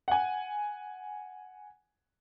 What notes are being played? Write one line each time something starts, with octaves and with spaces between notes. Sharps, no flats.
F#5 G#5